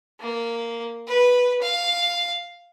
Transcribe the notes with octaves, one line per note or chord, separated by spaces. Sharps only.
A#3
B4
F5